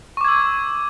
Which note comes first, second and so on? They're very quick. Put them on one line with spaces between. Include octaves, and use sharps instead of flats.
C#6 D6 G#6 E6